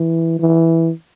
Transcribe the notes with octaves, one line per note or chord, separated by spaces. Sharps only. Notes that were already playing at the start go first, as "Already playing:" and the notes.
Already playing: E3
E3